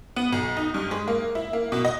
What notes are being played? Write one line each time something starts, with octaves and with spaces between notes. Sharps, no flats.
B3
B1
D#4
G2
G#3
A#3
E4
A#3
B2
D#5